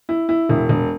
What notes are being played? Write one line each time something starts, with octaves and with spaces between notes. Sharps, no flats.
E4
E4
E1
E1